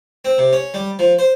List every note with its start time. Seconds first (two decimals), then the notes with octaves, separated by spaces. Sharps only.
0.25 C4
0.38 C3
0.53 C#4
0.74 G3
0.99 F3
1.19 C5